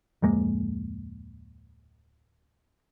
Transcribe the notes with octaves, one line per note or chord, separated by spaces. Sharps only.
D1 F2 G#3 A#3